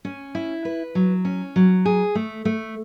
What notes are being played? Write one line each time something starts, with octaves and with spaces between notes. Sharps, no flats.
C#4
E4
B4
F#3
C#4
F#3
G#4
A3
A3